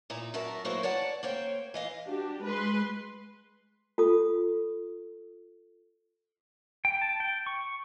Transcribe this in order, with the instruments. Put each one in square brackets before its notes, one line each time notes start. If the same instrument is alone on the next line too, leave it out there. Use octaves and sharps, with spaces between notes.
[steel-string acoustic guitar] A#2 D#4 E4 A#5
F#2 F#4 A#4 E5 A5
F#3 A#3 E4 F#4 B4 C5
C#5 D5 F#5 A5
A#3 C5 C#5 G5
E3 D#5 F5
[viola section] D4 F#4 G4
G#3 B4 C6
[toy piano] F4 A4 D#6
[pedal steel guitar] G5
A5
G5
C#6